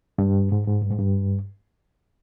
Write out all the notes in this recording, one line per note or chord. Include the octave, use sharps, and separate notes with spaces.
G2
G#2
G#2
G2
G#2
G2